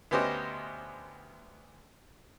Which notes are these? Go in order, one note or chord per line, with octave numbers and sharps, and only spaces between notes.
D2 B3 C#4 G4 C5 D#5